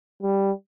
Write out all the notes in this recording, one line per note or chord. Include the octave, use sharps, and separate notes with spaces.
G3